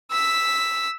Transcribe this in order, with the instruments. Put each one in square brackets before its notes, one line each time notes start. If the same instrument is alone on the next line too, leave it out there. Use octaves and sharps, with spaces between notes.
[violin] E6 B6